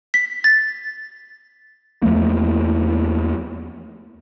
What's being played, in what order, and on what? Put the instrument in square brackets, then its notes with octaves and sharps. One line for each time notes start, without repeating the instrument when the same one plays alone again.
[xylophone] B6
A6
[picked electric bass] E2 F3 A3 A#3